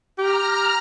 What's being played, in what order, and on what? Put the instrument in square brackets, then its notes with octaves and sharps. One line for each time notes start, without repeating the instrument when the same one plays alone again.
[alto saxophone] G4 [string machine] A#5 F6